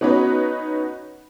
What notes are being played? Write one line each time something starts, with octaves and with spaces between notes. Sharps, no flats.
B3 C#4 D#4 F#4 B4 C#5